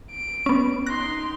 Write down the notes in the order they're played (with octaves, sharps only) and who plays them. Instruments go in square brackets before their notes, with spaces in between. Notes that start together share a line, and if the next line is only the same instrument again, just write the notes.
[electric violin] D7
[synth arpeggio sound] B3 C#4
[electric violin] D#4 C6 [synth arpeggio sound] F#6 A#6